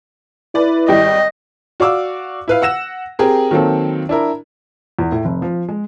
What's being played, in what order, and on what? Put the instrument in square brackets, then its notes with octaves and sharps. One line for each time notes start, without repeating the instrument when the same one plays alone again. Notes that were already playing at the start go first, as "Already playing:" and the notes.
[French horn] E4 [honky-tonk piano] B4 D5
[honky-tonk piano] G#1 G3 G5 [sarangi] D#5
[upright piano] F#4 D5 F5 D6 E6
E4 B4 F5
F#5 E6 A#6 E7
C4 G4 G#4 A#4
D#3 F#3 A#3 C4 A4
D4 E4 A#4
[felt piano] E2
A2
F1
F3
G#3